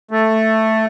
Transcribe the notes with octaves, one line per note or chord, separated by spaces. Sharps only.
A3